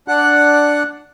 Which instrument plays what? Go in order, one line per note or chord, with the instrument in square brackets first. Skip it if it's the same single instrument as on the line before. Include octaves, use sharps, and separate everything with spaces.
[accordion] D4 F#5 F#6